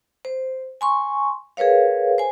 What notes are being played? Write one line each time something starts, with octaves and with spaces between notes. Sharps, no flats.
C5
G#5 C6 C#6
G#4 A#4 B4 C#5 F5
C5 G#5